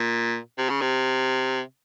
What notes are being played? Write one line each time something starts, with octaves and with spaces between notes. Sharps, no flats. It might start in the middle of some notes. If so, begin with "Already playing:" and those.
Already playing: A#2
C3
C#3
C3